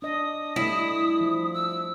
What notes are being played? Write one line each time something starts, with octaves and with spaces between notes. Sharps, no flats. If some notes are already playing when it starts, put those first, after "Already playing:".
D4 D#5 D#6
G3 A3 E4
F3
E6